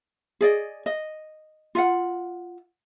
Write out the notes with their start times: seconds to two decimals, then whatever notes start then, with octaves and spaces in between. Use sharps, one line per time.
0.41 G#4 D5 D#5
0.86 D#5
1.75 F4 F5 F#5